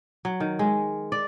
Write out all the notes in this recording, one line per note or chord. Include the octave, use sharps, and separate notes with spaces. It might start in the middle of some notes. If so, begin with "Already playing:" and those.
F#3
D#3
G#3
D5